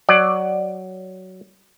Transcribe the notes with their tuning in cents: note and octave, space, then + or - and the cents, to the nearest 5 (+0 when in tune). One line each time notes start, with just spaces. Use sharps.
F#3 +10 D5 +20